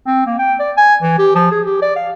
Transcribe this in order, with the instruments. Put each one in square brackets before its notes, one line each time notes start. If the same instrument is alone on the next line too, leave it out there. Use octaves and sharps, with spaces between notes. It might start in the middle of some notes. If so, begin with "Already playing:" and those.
[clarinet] C4
A#3
G5
D5
G#5
E3
G4
F3
G#4
G4
D5
F5